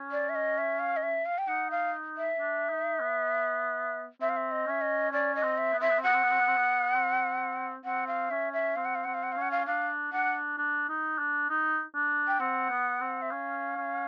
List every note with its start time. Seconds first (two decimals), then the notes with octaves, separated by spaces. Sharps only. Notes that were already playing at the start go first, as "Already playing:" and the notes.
Already playing: C#4
0.12 D5
0.29 E5
0.35 D#5
0.58 E5
0.80 F5
0.97 D#5
1.03 E5
1.26 F5
1.38 G5
1.48 D#4 F#5
1.71 F5
2.17 E5
2.39 D4
2.69 D#4
3.00 B3
4.21 C4 E5
4.29 F5
4.37 E5
4.51 D#5
4.67 C#4 E5
4.81 D#5
5.12 C#4 D5
5.35 D#5
5.43 C4
5.58 E5
5.73 B3
5.81 C4 E5
5.89 B3
5.98 C4
6.03 B3 F#5
6.14 C4
6.23 B3
6.31 C4
6.39 B3
6.47 C4
6.56 B3
6.94 C4
7.85 C4 F#5
8.07 F5
8.31 C#4 E5
8.53 E5
8.76 C4 F5
8.85 F#5
8.95 F5
9.04 C4 F#5
9.14 F5
9.23 F#5
9.32 F5
9.37 C#4
9.42 F#5
9.51 F5
9.67 D4 F5
10.12 D4 F#5
10.58 D4
10.89 D#4
11.18 D4
11.49 D#4
11.95 D4
12.27 G5
12.40 C4 F#5
12.70 B3
13.01 C4
13.22 E5
13.30 C#4 F5
13.77 C#4